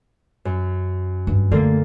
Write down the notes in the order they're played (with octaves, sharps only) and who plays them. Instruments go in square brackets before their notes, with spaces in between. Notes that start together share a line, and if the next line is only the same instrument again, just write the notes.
[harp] F#2
[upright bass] G2
[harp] D3 A#3 A6 [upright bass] A3